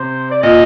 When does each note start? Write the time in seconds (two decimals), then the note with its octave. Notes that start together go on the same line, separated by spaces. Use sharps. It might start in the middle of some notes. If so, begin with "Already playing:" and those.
Already playing: C3 C5
0.31 D5
0.43 A#2 D#5